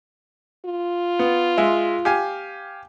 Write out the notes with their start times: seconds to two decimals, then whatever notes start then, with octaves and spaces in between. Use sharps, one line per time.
0.65 F4
1.19 B3
1.58 G#3 E5
2.05 G4 F5 G#5